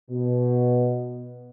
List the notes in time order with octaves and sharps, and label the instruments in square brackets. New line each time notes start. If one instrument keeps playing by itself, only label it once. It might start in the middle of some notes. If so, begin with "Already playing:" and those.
[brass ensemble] B2